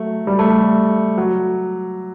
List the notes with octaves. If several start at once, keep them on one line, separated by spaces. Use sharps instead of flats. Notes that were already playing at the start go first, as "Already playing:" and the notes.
Already playing: F#3 A3
G3
A3
G3
F#3